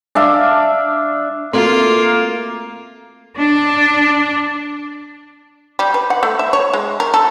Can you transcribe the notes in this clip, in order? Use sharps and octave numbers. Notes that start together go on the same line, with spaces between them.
D4 E5 F5 D6
A3 A#3 C4 F4 F#4
D4
G3
B4
F#5
A3
E5
C#5
G#3
A#4
A4